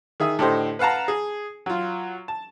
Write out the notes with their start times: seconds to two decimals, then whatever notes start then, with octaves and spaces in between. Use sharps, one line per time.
0.20 D#3 G#4 E5 D#6
0.39 A2 D3 G4 A4 C5 D#5
0.79 B4 F5 F#5 A5 A#5
1.08 G#4
1.66 F#3 F4
2.28 A5